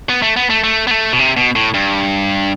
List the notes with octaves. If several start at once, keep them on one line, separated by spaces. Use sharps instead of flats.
B3
A3
B3
A3
A3
B3
A3
B2
C3
B2
A2
G2